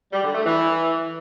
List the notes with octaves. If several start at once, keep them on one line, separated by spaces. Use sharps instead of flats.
G3
D3
A3
E3